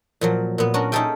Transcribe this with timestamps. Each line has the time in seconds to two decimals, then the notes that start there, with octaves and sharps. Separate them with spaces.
0.21 A#2 F3 F#3
0.58 A#2 B3
0.74 C#4 D4 F#4 A#4
0.92 C#4 D#4 G#4 A4 E5 G5